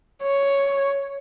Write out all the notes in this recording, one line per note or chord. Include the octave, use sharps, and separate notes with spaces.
C#5